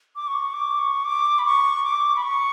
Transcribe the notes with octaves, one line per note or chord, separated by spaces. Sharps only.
D6
C#6
D6
C#6
D6
B5
C#6
D6
B5
C#6